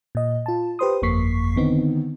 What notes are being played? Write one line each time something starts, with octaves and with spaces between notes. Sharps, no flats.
A#2 D#5
F4 A5
G4 B4 C5 C6 D#6
G1 F2 A#3 C#6 B6 C7
D3 D#3 B3 C4 D#4